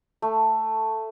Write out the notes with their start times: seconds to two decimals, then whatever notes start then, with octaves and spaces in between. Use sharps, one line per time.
0.22 A3